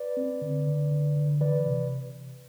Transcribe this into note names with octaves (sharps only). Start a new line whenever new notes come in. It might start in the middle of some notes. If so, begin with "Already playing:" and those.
Already playing: B4 D5
C4
D3
D3
D3
D3
E3 B4 D5
C3